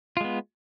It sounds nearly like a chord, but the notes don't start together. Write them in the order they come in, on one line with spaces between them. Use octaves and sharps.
F4 G#3 B3